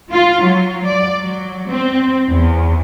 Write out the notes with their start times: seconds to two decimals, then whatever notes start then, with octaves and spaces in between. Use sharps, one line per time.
0.12 F4
0.43 F#3
0.85 D5
1.19 F#3
1.68 C4
2.28 E2